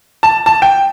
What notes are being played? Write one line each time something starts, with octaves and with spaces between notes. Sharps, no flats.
A5
A5
G5